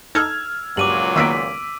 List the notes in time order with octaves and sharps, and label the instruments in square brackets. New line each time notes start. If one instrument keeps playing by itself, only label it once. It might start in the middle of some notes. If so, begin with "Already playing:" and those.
[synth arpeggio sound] D#4 A4 G6 [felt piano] E6 F6 G#6
[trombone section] C#2 A#2 F#3 [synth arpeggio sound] G2 [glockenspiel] D6 D#7 F#7
[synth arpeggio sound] D#3 A#3 B3 [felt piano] E6 B6 D7